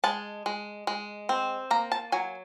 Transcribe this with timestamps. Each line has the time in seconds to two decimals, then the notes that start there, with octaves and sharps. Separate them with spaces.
0.04 G#3 A5
0.46 G#3
0.87 G#3
1.29 C4
1.71 A#3 A#5
1.92 A5
2.12 F#3 G#5